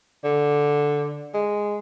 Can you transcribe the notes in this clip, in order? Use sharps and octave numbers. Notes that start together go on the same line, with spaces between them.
D3
G#3